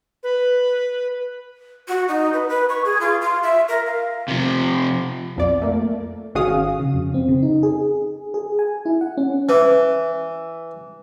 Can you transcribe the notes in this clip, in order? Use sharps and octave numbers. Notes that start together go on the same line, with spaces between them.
B4
F#4
D#4
B4
B4
C#6
G#4
F4
F4
E5
A#4
F5
C3 F3
B1 F2 D5
A3 A#3
G#1 C#4 F#4 G#4 F5 D#6
C#3
F2
C4
C#3
D#4
G#4
G#4
G#5
E4
F#5
C#4
E3